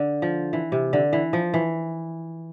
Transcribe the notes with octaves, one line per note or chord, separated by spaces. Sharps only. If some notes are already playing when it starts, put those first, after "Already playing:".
Already playing: D3
F3
E3
C3
D3
E3
F3
E3